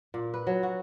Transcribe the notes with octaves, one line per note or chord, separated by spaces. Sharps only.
A#2
B4
F#3
F#4